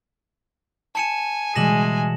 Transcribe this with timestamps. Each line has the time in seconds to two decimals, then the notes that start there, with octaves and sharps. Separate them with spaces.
0.95 G#5 A5 C#7 E7
1.56 B2 E3 G3 G#3 A#6 E7 F#7